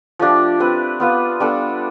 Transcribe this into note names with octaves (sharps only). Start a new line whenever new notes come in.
F3 A3 D4 G4
C4 G4 B4
B3 F4 B4
G3 B3 D4 A4